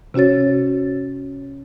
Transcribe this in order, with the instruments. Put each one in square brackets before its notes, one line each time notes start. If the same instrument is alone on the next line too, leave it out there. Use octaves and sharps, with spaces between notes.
[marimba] C3 C#4 F#4 C#5 A6